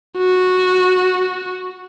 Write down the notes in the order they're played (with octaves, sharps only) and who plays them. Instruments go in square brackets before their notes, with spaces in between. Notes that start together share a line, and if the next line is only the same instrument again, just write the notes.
[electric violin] F#4